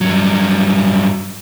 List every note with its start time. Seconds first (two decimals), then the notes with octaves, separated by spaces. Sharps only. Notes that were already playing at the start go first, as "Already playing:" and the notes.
0.01 G2 F#3